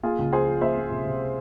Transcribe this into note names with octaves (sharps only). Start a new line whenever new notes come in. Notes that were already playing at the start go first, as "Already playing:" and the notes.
A#3 F4 G#4
C#2
F3 G#4 C5
F3
A#3 C5 E5
A#3
C3
C3